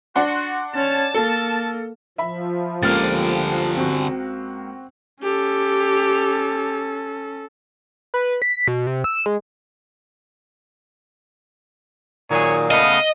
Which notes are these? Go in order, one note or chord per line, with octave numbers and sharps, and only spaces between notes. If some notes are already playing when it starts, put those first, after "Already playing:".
D4 F#4 F#5 C6
C#4 C#5 A5
A#3 A4
F3 E5 B5
C#2 D3 A#3 G4 F6 A6
C4 F#4
C#4 G4 A4
B4
B6
B2
C3
E6
G#3
A#2 D#3 F#3 G#4 C#5
C#3 A3 B3 D#5 F5